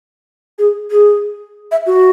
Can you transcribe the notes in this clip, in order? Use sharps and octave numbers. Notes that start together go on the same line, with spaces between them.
G#4
G#4
E5
F#4